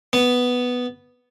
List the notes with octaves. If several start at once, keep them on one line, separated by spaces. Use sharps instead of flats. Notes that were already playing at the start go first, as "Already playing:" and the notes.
B3